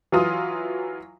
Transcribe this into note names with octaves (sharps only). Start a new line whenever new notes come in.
E3 F#3 F4 D#6